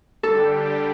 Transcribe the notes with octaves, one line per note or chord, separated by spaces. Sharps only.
D3 G3 D4 G4 A4